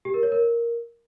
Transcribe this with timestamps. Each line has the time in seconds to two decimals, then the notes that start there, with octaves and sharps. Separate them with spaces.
0.05 G4
0.14 A#4
0.23 C#5
0.32 A#4